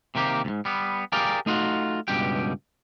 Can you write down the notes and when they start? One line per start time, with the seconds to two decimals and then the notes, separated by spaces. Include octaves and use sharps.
0.15 C3 D#3 A#3 G4
0.45 D2 G#2
0.65 G3 B3
1.12 G4 G#4 A#4 D5 F5 G5
1.46 A3 D#4 F4 F#4
2.08 C#2 G2 B2 G4 G5